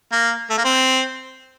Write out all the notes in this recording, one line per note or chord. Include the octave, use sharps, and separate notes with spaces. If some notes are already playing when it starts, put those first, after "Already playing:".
A#3
A3
A#3
C4